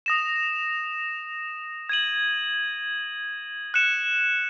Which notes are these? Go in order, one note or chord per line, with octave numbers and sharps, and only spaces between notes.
D#6 A#6 E7
G#6 D#7 F#7
F#6 C#7 E7